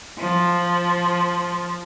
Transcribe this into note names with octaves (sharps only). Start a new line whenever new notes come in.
F3